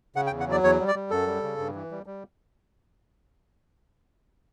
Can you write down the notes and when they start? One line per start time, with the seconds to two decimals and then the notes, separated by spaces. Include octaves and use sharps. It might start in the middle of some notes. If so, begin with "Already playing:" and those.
0.16 C#3 F#5
0.27 G5
0.32 E2
0.40 F#5
0.47 F#3 D5
0.63 E2 C#5
0.80 G3
0.88 D5
0.95 G3
1.11 F#2 A4
1.27 G3
1.43 C#3
1.58 G2
1.75 E3
1.91 G3
2.06 G3